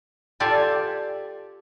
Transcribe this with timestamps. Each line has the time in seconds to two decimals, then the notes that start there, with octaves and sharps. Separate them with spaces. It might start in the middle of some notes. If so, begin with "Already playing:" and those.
0.40 F4 G4 A4 D5 G#5